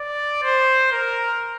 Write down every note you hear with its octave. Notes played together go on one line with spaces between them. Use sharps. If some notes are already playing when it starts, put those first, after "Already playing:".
Already playing: D5
C5
A#4